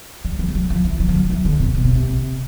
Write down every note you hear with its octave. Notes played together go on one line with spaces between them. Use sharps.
G3
F#3
G3
F#3
F3
E3
F#3
F3
F#3
E3
D3
C3
B2
C3
C3